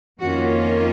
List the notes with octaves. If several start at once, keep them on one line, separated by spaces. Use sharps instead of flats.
F2 D#3 A#3 C#4 F4 F#4